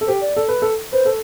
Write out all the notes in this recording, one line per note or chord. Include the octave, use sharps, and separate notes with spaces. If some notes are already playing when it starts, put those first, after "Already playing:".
A4
G4 C5
D5
A4
B4
A4
B4 C5
A4